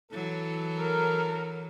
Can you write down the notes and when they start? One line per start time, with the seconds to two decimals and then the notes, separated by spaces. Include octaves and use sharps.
0.12 E3 F#3 E4 A4
0.79 A#4